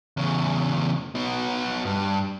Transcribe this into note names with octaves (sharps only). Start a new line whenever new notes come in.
E2 C#3
B3 D#4
G2